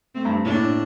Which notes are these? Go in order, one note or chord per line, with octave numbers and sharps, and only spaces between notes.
A3 C4
G2
A2 A#3 D4